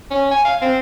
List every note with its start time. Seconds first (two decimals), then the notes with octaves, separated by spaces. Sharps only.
0.11 C#4
0.31 G#5
0.45 F5
0.62 C4